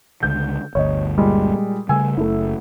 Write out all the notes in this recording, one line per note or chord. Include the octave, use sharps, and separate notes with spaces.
C#2 D3 G6
G1 D2 C#5 D#5
A#2 G3 G#3
C#3 G3 A3 G#5 E6
F#1 A3 E4